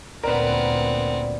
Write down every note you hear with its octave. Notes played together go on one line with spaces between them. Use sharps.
D2 A#2 B3 C4 A#4 B4 D5